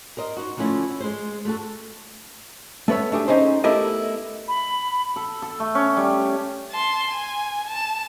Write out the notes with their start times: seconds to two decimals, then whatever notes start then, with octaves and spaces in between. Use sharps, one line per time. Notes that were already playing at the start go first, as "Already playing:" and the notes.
0.17 A#4 C5 D#5
0.37 D#4 F#4
0.57 D3 F3 A3 C#4 E4
1.00 G#3 C5
1.45 A3 F#4 A4
2.88 A3 B3 B4 C#5 E5
3.12 A3 D4 G4 G#4
3.28 C#4 D#4 G#4 C5
3.64 A3 B3 E4 G4 A#4 D#5
4.48 B5
5.16 A4
5.42 A4
5.60 A3
5.75 C#4
5.96 G3
6.71 A5 C6
7.11 G#5
7.67 A5